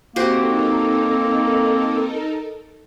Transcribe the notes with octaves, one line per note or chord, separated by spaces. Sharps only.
A#3 C4 D#4 F#4 G4 A4 A#4 C5